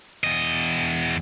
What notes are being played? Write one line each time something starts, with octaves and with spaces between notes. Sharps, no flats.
E2 D#5